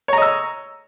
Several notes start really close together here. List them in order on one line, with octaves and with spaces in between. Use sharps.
C#5 A#5 D#5 E6